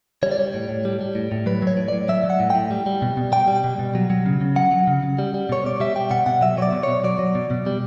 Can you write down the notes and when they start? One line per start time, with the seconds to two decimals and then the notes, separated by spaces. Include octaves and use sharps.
0.23 G3 C#5
0.31 D5
0.38 G3 C#5
0.54 A2
0.69 A2
0.85 G3
1.01 G3
1.15 A2
1.32 A2
1.46 F#3 B4
1.62 F#3 C#5
1.77 A2
1.88 A2 D5
2.09 F#3 E5
2.24 F#3
2.30 F#5
2.40 A2
2.50 A2 G5
2.71 G3
2.86 G3
3.02 B2
3.17 B2
3.32 G3 G5
3.48 G3
3.64 B2
3.79 B2
3.95 F#3
4.10 F#3
4.26 C#3
4.41 C#3
4.56 F#3 F#5
4.71 F#3
4.87 C#3
5.03 C#3
5.19 G3
5.34 G3
5.49 B2 C#5
5.64 B2 D5
5.80 G3 E5
5.96 G3 G5
6.10 B2 F#5
6.26 B2 F#5
6.41 F#3 E5
6.57 F#3 C#5
6.62 D5
6.72 B2
6.83 C#5
6.88 B2
7.04 F#3 D5
7.19 F#3
7.35 B2
7.51 B2
7.66 G3